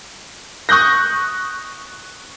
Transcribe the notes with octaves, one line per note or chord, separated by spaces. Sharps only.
C#6 D#6 F#6 G6 A#6